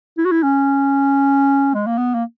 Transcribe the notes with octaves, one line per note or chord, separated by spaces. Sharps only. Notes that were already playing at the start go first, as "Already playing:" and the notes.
E4
F#4
E4
C#4
G#3
A#3
B3
A#3